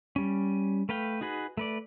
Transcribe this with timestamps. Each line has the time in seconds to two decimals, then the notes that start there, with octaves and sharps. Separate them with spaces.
0.16 G3 C#4
0.89 A3 B4 F5 G5
1.21 D#4 F#4 G#4 B4
1.57 A3 B4 D5